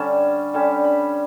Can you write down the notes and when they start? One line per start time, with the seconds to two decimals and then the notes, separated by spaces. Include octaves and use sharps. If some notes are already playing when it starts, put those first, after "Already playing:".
Already playing: D3 G3 C#4 A5
0.54 D3 G3 C#4 A5
0.85 B5